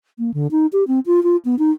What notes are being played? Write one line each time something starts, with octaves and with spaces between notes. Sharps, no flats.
A#3
D3
D#4
G4
C4
F4
F4
B3
D#4